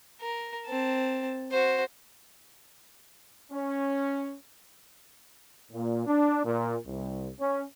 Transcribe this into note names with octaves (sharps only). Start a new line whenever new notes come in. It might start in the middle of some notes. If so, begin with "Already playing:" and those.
A#4
C4 A5
F#4 C5
C#4
A#2
D4
A#2
C2
C#4